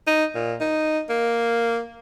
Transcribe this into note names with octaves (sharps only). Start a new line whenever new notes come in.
D#4
A#2
D#4
A#3